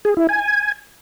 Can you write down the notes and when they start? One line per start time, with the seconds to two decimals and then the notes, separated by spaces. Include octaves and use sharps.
0.05 G#4
0.17 E4
0.29 G#5